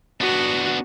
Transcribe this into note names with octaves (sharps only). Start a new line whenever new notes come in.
B3 D4 F#4